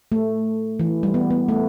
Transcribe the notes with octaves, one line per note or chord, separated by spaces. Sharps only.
A3
E3
G3
B3
B3
A3